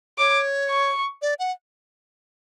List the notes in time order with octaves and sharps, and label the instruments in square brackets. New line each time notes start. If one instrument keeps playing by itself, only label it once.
[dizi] C#5 [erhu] D6
[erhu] C#6
[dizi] D5
F#5